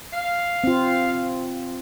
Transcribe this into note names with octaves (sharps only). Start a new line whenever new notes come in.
F5
C4 F4